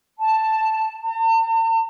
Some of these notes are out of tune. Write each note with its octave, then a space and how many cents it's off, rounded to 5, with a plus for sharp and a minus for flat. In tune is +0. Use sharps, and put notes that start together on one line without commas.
A5 +0
A5 +45